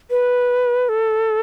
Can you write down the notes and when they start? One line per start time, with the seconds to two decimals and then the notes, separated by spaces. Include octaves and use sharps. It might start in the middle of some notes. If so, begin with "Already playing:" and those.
0.10 B4
0.89 A4